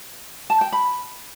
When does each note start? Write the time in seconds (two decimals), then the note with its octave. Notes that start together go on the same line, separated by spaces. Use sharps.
0.50 A5
0.61 G5
0.72 B5